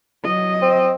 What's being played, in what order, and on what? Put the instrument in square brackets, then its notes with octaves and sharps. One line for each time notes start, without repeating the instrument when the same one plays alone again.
[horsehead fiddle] F#3 D#5
[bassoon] C4